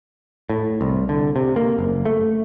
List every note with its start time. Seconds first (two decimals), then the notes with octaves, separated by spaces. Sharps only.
0.50 A2
0.81 C2
1.09 D3
1.36 C3
1.56 A#3
1.79 F#1
2.06 A3